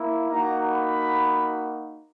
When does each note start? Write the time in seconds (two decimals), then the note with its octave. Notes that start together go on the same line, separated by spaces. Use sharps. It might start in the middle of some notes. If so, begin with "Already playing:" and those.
Already playing: A#3 E4
0.30 A#3 D#4 F#4 A#5
0.69 B5